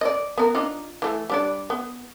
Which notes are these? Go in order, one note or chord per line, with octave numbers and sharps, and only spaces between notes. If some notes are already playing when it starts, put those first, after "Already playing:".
D5 D#5
B3 A#4
D4 D#4 F4
E3 A3
G3 D4 D5
B3